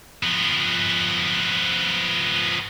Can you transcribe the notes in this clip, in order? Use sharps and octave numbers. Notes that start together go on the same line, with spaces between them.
F3 B3